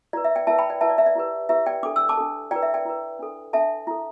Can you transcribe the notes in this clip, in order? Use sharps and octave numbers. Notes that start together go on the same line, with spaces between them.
E4 B4 D5
E5
D5 G5
E4 B4 E5 A5
G5 B5
D5 G5
E4 B4 E5 A5
D5
E5
D5
E4 G4 B4
E4 G4 B4 E5
D5 G5
D4 A4 D6
E6
A5 D6
D4 A4
E4 B4 D5 G5
E5
D5 G5
E4 B4
D4 A4
D4 A4 E5 A5
E4 A4